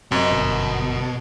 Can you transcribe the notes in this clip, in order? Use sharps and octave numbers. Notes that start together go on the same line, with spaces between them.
F#2 C3 C4 F#4 D#5
G1 B2